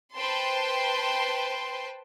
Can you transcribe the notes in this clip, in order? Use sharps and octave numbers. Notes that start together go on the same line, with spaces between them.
B4 C5 G5 A5 C6